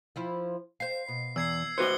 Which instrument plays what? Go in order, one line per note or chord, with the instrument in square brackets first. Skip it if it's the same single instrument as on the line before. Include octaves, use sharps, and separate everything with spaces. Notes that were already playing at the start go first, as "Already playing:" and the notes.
[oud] F3 E4 F4
[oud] C5 F5 [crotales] C7
[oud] B2
[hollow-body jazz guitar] E2 [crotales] E6 G#6 C7
[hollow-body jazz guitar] F#4 B4 C5 [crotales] C#7 G7